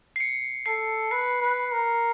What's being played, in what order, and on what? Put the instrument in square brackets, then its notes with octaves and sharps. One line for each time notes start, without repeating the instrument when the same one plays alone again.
[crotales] C7
C#7
[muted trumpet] A4 [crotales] C7
[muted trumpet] B4 [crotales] C7
[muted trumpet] B4
A#4